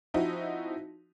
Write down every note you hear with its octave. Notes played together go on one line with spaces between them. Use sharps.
F3 C4 D#4 E4 F#4